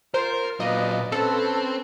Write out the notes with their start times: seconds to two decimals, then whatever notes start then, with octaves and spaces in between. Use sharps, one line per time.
0.14 F4 A#4 C5
0.60 A#2 F#3 B4 D5 D#5 F5
1.12 C4 C#4 A4 B4 A5